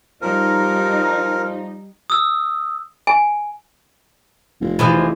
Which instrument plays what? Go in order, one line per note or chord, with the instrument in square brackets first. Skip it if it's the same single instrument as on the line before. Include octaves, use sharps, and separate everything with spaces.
[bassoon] F3 [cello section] G3 D#4 [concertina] A#4
[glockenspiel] D#6 E6
[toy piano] G#5
[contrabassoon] F1
[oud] E3 F3 G#3